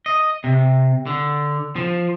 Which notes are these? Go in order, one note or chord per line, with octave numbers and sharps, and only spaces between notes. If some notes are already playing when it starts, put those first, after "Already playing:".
D#5
C3
D3
F3